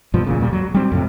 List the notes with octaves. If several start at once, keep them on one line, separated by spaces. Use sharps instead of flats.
G2 B2 F3
D#1 A1 A#2 C#3
D#2 A#2 G3
F#3
G3 C4
F2 A2 C3